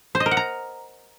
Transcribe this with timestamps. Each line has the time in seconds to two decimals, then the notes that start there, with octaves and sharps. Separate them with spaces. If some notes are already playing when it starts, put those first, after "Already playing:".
0.15 C5
0.20 D#5
0.26 A#4
0.31 F#5
0.37 A#5